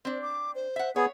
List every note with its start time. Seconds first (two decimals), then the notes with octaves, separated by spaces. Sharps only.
0.05 C4 D4 C5
0.22 D6
0.55 C5
0.76 E5 F#5
0.96 B3 G#4 C#5 F#5